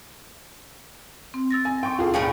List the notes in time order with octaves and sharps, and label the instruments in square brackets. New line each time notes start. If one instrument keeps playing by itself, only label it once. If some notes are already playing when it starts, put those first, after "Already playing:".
[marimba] C4
E6 A6 A#6
[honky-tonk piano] G#5
[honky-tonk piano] G5 C#6 [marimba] C6
[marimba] D#2 B2 [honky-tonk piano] F4 G#4 A4
[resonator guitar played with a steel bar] A2 C#4 G#4 [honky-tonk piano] F5 G5 C#7